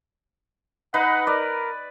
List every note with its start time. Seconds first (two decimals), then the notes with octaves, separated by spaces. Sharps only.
0.94 D#4 B4 D#5 F#5
1.27 A#4 D5